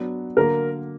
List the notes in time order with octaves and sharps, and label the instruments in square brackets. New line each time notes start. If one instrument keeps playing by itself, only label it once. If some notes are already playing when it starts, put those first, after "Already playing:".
Already playing: [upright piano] F#3 B3 D4
[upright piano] D3 F#3 A#3 [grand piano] A#4